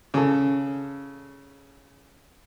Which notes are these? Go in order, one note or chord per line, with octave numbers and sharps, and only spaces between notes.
C#3 A4